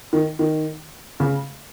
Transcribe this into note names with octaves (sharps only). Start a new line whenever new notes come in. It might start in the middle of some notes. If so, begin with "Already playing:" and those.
D#3
D#3
C#3